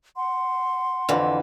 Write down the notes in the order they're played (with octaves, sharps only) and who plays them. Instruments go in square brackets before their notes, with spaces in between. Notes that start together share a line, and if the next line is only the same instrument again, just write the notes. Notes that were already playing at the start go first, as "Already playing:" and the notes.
[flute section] F#5 C6
[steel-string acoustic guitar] F2 D3 E3